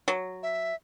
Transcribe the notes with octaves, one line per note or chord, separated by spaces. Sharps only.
F#3
E5